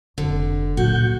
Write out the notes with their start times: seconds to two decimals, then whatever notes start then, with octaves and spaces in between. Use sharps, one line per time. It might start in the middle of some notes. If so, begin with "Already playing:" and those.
0.18 F1 D3
0.77 C#2 A#2 F#3 F#4 F#5 G6